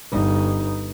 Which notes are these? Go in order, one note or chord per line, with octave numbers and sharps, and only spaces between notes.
G1 D#4